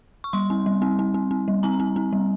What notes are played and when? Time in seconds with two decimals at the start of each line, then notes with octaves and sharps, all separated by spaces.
0.24 C#6
0.33 G3 C6
0.50 C4
0.66 G3
0.82 C4
0.99 C4
1.14 C4
1.31 C4
1.48 G3
1.63 C4 A#5
1.80 C4
1.96 C4
2.13 G3